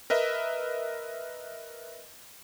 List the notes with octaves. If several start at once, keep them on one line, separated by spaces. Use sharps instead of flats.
A#4 B4 D#5 E5